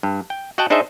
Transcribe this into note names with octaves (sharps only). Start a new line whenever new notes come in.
G2
G5
F#4 D#5 F#5 G5 A5
D4 D#4 G#4 C5 D#5 E5